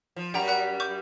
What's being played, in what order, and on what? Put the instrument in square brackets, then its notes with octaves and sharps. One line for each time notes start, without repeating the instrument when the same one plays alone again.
[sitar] F3
[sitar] F#2 G3 G4 [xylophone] F#5 G5 A#5
[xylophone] F#5 A#5 F#6
C#6 D6 G6